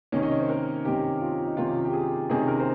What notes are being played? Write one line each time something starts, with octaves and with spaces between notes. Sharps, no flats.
C3 D#3 A#3 C#4 C#5
D#5
C#5
C5
A#4
C3 D#3 A#3 C#4 G4
F4
D#4
C3 D#3 A#3 C#4 F4
G4
G#4
C3 D#3 A#3 C#4 G#4
A#4
C5